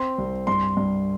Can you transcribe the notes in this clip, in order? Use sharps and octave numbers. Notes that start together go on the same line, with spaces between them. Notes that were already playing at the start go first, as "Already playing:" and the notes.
Already playing: C4 C6
C2
G2 C6
G2